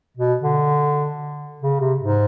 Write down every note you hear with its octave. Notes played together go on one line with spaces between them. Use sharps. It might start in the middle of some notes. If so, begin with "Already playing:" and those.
B2
D3
C#3
C3
G#2